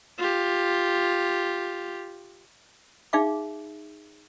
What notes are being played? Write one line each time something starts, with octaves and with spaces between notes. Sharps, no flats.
F4 G4
D#4 G#4 E5 F5 D6